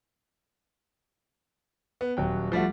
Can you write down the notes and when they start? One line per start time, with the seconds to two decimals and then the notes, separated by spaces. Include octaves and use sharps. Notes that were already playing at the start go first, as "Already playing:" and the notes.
2.01 B3
2.17 D#1 F#3 G5
2.52 F3 G3 A3 F#4